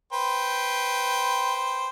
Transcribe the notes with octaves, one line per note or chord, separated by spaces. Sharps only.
B4 C5 G5